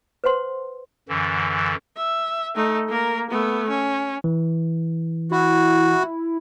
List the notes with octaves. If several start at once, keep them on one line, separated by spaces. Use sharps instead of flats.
B4 C5 F#5 C6
F#2 D3 E3
E5
A3 D#4
A#3 A#4
A3 B3
C#4
E3
E4 F#4